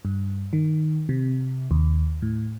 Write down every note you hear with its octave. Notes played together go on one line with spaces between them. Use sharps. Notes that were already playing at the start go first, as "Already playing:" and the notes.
G2
D#3
C3
D#2
A2